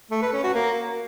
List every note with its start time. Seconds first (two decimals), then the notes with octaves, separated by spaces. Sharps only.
0.11 A3
0.22 B4
0.32 C#4
0.43 F#4
0.54 A#3